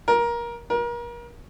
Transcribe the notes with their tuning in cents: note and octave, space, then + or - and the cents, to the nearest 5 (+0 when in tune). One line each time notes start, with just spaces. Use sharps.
A#4 +20
A#4 +35